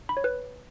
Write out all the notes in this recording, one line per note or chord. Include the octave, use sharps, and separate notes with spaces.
B5
C#5
B4